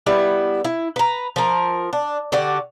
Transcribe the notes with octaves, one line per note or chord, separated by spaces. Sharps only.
G3 B3 E4 E5
E4
B4 A#5
F3 A#4
D4
D3 F#4 G4 D5